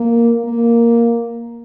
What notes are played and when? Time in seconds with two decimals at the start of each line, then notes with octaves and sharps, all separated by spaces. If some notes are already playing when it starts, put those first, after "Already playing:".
Already playing: A#3
0.45 A#3